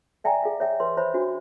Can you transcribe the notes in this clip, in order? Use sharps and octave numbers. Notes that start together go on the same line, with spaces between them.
D5 E5 G5 G#5 A#5
G#4 E5 F5
C#5 E5 G5
B4 C#5 C6
C5 C#5 E5 B5
D4 F#4